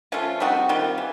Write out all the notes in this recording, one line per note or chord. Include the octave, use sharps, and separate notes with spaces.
F3 A3 C#4 F4
G3 C4 D#4 F#4
D#3 G3 C4 F4
E3